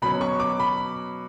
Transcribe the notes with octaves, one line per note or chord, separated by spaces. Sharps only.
B2 F#3 C#4 B5
C#6
D6
B5